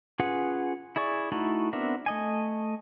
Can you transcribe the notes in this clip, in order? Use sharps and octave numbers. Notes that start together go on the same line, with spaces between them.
C#4 F4 G#4 B4 F#5
E4 G#4 D5 C#6
A3 D#4 E4 F#4 A4
B3 C4 D4 A#4 E5
A3 D#5 G#5